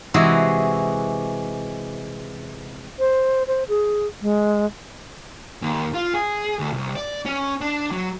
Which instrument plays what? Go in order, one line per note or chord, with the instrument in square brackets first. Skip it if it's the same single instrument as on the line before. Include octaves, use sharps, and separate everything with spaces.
[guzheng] C3 E3 G#3 F#4 G#4
[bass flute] C5
C5
G#4
G#3
[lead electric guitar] D#2
F4
G#4
D2
C2
D5
C#4
D4
F#3